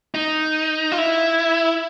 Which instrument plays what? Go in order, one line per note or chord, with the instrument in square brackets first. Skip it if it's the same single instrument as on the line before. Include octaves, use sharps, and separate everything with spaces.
[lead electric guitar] D#4
F4
E4